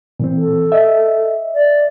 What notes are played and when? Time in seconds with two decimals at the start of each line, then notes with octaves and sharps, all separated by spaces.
0.20 A#2 E3 C4
0.38 A4
0.72 D#5 E5
1.54 D5